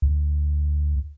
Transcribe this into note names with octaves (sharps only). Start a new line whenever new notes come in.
D2